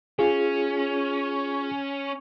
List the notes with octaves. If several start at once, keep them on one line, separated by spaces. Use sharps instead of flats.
C#4 F4 G#4